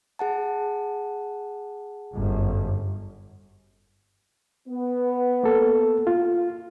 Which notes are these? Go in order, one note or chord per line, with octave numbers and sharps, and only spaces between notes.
G#4 F#5 A5
G1 F#2
B3
A#3 A4
F4